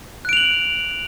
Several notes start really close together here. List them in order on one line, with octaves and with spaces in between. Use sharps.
F#6 D7 F7 F#7